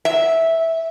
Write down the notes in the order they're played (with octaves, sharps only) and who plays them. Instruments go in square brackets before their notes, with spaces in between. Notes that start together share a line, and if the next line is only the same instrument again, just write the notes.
[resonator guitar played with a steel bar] E5